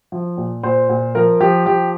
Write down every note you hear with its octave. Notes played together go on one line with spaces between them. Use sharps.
F3
A#2
A#2 C5
A#2
F3 A#4
F3 G4
F3 G4